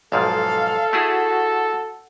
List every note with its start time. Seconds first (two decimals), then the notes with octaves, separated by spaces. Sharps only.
0.12 B1 G#2 F3 A4 F5
0.93 A3 E4 F#4 G#4